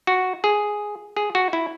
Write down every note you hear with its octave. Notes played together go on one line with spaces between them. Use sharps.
F#4
G#4
G#4
F#4
E4